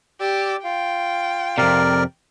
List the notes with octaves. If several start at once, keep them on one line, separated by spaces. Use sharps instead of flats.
G4 D5 D6 E6
F4 F5 G5
F2 C3 A#4 D5